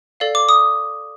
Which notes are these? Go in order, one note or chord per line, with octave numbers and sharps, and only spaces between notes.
A4 D5 F5
D6
D#6